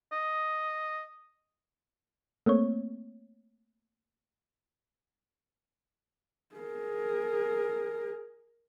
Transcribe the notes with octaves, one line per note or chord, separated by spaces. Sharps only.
D#5
A3 A#3 C4 C#5
G#4 A#4